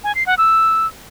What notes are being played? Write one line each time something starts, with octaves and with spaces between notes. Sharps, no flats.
G#5
C7
F#5
E6